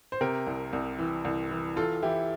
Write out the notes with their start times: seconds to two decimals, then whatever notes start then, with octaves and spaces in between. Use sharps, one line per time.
0.12 C5
0.21 C3 G4 A#4
0.47 C2
0.73 C2
0.99 E3
1.25 C2
1.51 E3
1.76 E3 F4 A4
2.03 E3 E4 G4